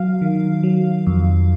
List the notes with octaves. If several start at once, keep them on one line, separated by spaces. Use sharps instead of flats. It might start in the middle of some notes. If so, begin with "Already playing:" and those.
Already playing: F#3 F5
D#3
F#3
F2